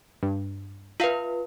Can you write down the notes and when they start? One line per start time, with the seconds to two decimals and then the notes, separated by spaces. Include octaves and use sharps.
0.23 G2
1.00 F4 B4 E5 F5